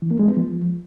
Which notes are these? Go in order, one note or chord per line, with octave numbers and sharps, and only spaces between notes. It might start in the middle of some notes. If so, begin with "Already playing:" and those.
E3
A#3
G#3
B3
F3